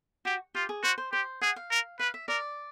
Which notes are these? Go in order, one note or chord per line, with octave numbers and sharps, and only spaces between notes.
F#4 G4
F4 G4
G#4
F#4 C5
C5
G4 C5
G#4 F#5
F5
A#4
B4 F5
E5
A#4 D5